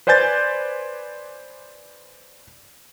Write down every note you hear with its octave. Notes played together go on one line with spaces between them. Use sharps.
B4 C5 D5 G#5 G6 A6